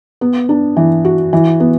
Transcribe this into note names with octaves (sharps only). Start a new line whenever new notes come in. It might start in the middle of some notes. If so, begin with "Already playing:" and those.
B3
D4
E3
F#4
E3
B3